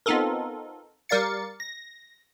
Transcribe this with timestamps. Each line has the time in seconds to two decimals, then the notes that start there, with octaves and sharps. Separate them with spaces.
0.06 B3 C4 D#4 F4 A4 A#4
1.09 G3 A#4 D5 F5 A6 C#7
1.60 A#6